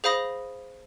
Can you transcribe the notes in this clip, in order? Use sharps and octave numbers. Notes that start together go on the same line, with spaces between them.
G#4 C5 F5 B5 D#6 A#6